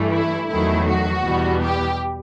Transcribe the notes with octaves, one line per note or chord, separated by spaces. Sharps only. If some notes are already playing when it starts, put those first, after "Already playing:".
Already playing: G2 E3 A3
E4
E2 D#3 F#3 A3 E4
F#4
E2 B2 G3 B3
G4